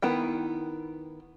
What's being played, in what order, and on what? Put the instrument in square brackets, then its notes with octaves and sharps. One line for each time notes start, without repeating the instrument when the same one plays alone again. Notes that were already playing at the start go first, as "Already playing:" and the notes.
[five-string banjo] D#3 B3 E4 G5